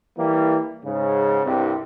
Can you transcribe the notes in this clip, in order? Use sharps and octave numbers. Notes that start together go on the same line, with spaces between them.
E3 G3 A#3
G#2 C#3
C2 G2 C3